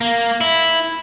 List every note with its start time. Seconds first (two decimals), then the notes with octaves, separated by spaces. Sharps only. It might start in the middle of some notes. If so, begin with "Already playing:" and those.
0.01 A#3
0.41 E4